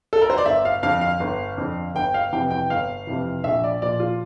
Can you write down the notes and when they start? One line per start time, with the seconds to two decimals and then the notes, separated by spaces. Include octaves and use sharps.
0.13 A4
0.22 A#4
0.30 C5
0.38 D5
0.45 G1 E5
0.65 F5
0.83 F2 D3 F5
1.01 F5
1.20 G1
1.58 F2 D3
1.95 G1 G5
2.14 F5
2.32 F2 C3 E3 G5
2.51 G5
2.70 G1 F5
3.07 F2 C3 E3
3.44 A#1 E5
3.64 D5
3.82 A#2 F3 D5
4.00 F4